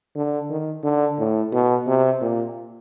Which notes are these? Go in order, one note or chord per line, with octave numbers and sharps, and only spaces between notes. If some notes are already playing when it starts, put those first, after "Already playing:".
D3
D#3
D3
A2
B2
C3
A#2